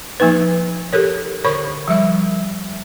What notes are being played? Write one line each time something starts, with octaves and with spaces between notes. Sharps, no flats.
F3 A#3 D#4 B4
G4 A4 A#4 C#5
D3 A#4 C#5 B5 C#6
F3 G3 E5